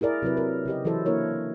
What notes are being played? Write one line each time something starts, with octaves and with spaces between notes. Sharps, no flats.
E4 G#4 A#4 D5
C3 F#3 E4 B4
A#4
C#3 G4 D#5
E3 F#3 E4 A4 C5
A#3 D4 E4 A#4 C#5